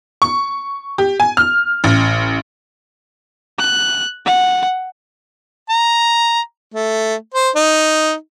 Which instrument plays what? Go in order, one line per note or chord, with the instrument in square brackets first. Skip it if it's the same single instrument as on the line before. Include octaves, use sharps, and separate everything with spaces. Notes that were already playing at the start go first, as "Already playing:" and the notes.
[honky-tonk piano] C#6
G4
G#5
F6
A1
[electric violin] F#6
F#5
[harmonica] A#5
A3
C5
D#4